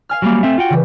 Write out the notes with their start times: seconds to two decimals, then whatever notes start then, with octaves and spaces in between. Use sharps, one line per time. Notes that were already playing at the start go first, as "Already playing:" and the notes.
0.09 F5 G#5 F6
0.22 F#3 G3 A#3
0.43 A3 C4 E5
0.58 F4 F#4 G5
0.70 C#3 E3 G3